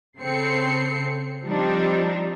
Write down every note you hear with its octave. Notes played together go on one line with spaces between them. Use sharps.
C#3 C4 A4 C7 C#7
F3 G3 C4 D4 D#4